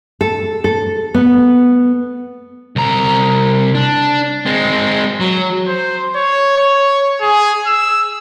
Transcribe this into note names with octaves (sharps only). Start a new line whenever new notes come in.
A4
A4
B3
C2 A#5
D4
G#3 C4
F#3
C5
C#5
C#5
G#4
E6